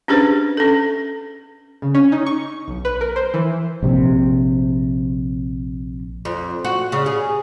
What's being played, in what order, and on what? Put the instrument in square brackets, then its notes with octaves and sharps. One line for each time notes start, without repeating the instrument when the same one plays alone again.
[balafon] C#4 D4 G4 G#4 B4 C5
C#4 A4
[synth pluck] C#3
C#4
D#4
C#6
B1
B4
A#4
C5
E3
[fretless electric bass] A#1 C3
[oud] F2
F#4
C#3
G#4